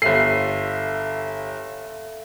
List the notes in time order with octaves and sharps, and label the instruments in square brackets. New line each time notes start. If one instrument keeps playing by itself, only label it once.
[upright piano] G1 C7 [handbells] A4 E5 F5